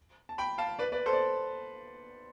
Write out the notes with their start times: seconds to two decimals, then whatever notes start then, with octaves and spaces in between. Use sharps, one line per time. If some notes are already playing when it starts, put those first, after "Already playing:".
0.29 A5
0.38 G5 B5
0.58 F5 A5
0.79 B4 D5
0.92 B4 D5
1.06 A4 C5
1.13 D5